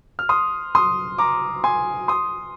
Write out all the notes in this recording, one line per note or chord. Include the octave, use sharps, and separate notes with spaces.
F6
C6 D#6
C6 D#6
A#5 D6
G#5 C6
C6 D#6